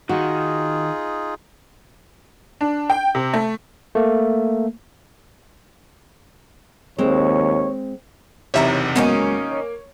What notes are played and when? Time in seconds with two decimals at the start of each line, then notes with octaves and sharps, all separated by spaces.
0.09 D#3 D#4 F4 F#4 G#4
2.61 D4
2.90 G5
3.15 C3
3.34 A3
3.95 A3 A#3
6.98 D#2 G#3 C4 C#5
8.54 F#1 E2 C3 D#4 C#5 E5 A#5
8.96 C#2 G#2 D#3 F#3 A#3 B3 C#4 D#4
9.51 C#5